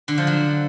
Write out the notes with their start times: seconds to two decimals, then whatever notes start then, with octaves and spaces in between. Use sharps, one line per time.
0.08 D3
0.18 F3
0.27 F#3